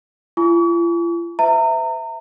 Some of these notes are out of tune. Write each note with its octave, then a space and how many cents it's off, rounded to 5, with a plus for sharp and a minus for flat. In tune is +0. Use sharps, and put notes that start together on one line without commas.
F4 -45 G#5 +20 C#6 +45
B4 +40 E5 +0 A#5 -30